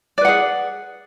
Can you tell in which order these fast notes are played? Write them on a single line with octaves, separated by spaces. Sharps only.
D5 B4 F#5 G#4